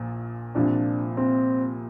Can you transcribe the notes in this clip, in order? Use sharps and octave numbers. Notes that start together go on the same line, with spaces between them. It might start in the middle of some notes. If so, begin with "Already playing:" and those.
Already playing: A#1 A#2 F3
C2 A#2 F3 D4
C4